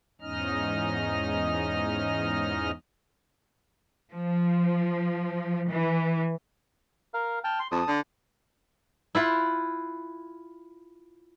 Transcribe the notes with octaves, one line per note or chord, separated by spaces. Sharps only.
E2 G#2 C#4 D#4 D#5 F6
F3
E3
A#4 F5
G5 A5 F6
C6
F2 A5 D#6
D3
E4 F4 F#5